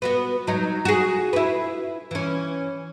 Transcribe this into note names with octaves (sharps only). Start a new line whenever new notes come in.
B3 F#4 B4
F#3 D#4
F#4 G#4
E4 B4
E3 C#4